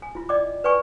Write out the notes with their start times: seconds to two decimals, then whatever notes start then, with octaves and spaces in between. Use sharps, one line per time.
0.02 G#5
0.15 E4 F4
0.29 D5 D#5 G5 D6
0.64 B4 D5 G5 G#5 C#6